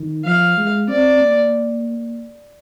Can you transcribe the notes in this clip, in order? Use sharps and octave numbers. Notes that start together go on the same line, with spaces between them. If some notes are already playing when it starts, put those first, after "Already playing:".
Already playing: D#3
F3 F5
G#3
C4 D5
A#3